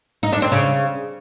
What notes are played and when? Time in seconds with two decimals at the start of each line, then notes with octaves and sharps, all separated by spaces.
0.23 D#4
0.33 D4
0.42 C4
0.52 C#3